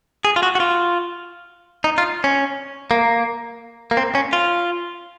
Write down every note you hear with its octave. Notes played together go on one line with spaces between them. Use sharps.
G#4
F4
F#4
F#4
F4
D#4
F4
C#4
A#3
A#3
C4
C#4
F4